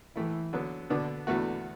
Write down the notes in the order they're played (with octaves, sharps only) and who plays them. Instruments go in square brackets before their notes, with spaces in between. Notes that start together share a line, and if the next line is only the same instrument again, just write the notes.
[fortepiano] A2 A3 E4 [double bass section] E3
[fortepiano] D3 F#3 B3
[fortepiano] B2 B3 D4 [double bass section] D3
[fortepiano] E2 B2 A3 F#4 [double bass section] D3